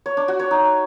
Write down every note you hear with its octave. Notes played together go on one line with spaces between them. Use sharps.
C#5
D4
F#4
C#5
D#4